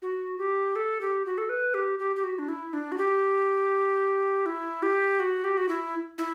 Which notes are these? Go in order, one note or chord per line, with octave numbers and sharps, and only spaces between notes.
F#4
G4
A4
G4
F#4
A4
B4
G4
G4
G4
F#4
D4
E4
D4
F#4
G4
E4
G4
F#4
G4
F#4
E4
E4